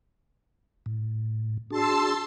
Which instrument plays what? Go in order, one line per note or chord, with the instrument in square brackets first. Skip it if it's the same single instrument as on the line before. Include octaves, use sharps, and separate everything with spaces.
[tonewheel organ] A2
[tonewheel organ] D4 F#4 G#4 [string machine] A5 C6 E6